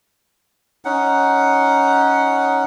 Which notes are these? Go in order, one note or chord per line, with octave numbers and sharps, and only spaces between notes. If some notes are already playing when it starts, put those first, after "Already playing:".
C#4 D#4 F#5